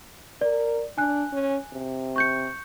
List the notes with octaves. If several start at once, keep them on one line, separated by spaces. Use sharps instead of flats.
A#4 D5
D4 G#5 F#6
C#4
C3
C#6 G6 C#7